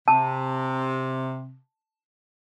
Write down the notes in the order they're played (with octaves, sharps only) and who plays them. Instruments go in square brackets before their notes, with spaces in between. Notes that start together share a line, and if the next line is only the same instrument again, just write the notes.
[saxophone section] C3 [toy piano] A5